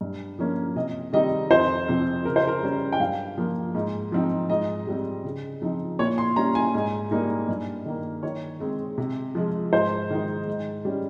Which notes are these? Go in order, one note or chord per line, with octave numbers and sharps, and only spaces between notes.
G2
F3 A#3 C#4
C3 D#5
D#3 G3 C4 D#4 D#5
F2 C5
C3 F3 C4
C#3 A#4
C5
A#4
G3 C#4
G5
G2 F5
F3 A#3
G#2
F3 C4 D#4
G#2 D#5
G3 C4
C#3
F3 C4 D#4
A#2 C#5
C6
G3 C#4 A#5
G#5
G#2
G3 A#3 D#4
G2
D#3 A#3
D#3 C#5
G#3 C4
C3
F3 G#3
G#2 C5
D#3 G#3 D#4
G#2
G3 C#4